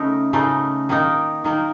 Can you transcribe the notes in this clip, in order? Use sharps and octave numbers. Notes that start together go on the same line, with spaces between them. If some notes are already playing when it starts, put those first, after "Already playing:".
Already playing: C#3 A3 D#4 A#4
C#3 A3 D#4 A#4
D#3 A#3 D#4 A#4
D#3 A#3 D#4 A#4